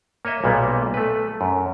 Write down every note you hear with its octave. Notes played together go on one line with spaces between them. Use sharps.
A#3 C#5 D#5 E5
B1 A#2 G3 A#3 B3
A3 B4
F#2